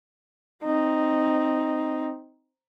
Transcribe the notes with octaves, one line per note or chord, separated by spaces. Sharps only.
C4 D#4